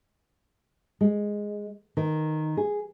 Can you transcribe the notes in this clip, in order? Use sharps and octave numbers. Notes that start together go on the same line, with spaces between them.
G#3
D#3
G#4